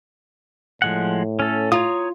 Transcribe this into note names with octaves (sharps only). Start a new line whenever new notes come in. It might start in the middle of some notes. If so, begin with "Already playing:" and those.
A2 F3 G#3 F#5
C#4 A4
F4 C#5 A#5 D#6